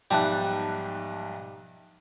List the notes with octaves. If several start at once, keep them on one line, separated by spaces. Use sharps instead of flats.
B1 G#2 F3 G3 E5 G5 A5 F#6